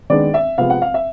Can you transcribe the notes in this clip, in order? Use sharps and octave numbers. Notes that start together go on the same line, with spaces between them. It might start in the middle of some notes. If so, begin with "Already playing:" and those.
D#3 G#3 B3 D4 D5
E5
C3 F3 G#3 B3 F5
F#5
F5
E5